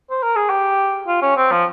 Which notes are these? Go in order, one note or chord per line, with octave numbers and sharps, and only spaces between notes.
C5
A#4
G#4
G4
F4
C#4
C4
F3